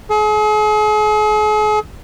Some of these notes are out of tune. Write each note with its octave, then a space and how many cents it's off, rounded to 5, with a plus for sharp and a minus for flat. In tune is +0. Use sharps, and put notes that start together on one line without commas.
G#4 +40